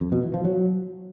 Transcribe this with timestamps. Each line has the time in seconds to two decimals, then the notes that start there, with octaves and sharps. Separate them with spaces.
0.01 F2
0.12 B2
0.23 E3
0.34 F3
0.45 F#3